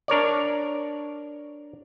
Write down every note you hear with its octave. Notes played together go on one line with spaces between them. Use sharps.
D4 A#4 C#5 D5